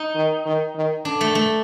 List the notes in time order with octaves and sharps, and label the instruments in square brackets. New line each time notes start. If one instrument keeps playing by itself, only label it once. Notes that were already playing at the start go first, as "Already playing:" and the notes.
Already playing: [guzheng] D#4
[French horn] D#3
D#3
D#3
[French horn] D3 [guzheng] D4
[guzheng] A3
A3